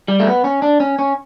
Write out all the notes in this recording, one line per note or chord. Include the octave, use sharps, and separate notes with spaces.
G3
A3
B3
C#4
D4
C#4
C#4